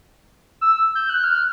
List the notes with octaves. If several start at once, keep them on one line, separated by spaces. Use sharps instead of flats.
E6
G6
F#6
F6